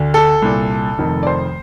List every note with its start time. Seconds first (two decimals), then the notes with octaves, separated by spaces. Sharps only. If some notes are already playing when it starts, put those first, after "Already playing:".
Already playing: D2 D3
0.14 A4
0.42 C2 A#2
0.99 F1 F2 D#3
1.23 D5
1.27 C5